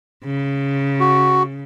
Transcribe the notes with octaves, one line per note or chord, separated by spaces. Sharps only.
C#3
F#4